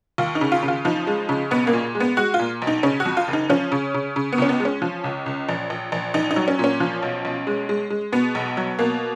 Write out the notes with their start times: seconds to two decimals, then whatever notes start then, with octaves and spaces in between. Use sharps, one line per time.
0.18 D#2 F4
0.35 D#4
0.41 C#3
0.52 F4
0.63 C#3
0.68 F4
0.85 F3 D#4
1.07 G#3
1.29 C#3
1.51 B1 B3
1.67 A#3
1.73 A#2
1.95 G#3
2.00 B3
2.17 G#3 F#4
2.34 F4
2.39 A#2
2.62 B1
2.67 D#4
2.83 C#3 C#4
3.00 F#4
3.05 F2
3.17 F4
3.28 F#1
3.33 D#4
3.50 F3 C#4
3.72 C#3
3.94 C#3
4.16 C#3
4.32 B3
4.38 C#2 C#4
4.49 B3
4.60 G#3
4.65 C#4
4.82 F3
5.04 C#2
5.26 C#2
5.49 A#1
5.70 A#1
5.92 A#1
6.14 A#1 D#4
6.31 D#4
6.36 F#3
6.48 C#4
6.59 A#2 C#4
6.80 F3
7.02 B1
7.25 B1
7.47 G#3
7.69 G#3
7.90 G#3
8.12 B2 B3
8.35 B1
8.57 F#3
8.79 B2 A#3